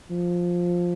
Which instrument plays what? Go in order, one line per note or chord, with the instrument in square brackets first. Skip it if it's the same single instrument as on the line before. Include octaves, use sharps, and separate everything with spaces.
[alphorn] F3